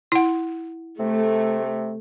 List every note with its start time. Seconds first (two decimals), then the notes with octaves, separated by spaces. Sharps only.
0.12 E4 F#5
0.99 C3 A3